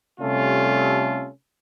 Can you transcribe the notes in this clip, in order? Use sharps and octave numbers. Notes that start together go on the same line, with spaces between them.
C3 G3 A3 C#4 F4 A4